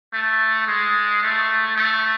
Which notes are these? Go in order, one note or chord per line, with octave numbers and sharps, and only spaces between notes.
A3
G#3
A3
A3